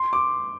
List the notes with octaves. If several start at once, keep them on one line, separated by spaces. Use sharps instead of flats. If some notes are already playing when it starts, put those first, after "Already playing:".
Already playing: C6
D6